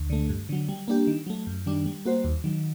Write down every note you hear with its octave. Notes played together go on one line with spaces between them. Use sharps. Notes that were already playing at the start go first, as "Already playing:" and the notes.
Already playing: D2
D3 A3
G2
D3 F#3
G3
A#3 D4 G4
D#3
F#3 A3
F#2
D#3 G3 D4
G3
A#3 F#4 C5
D#2
D#3 F#3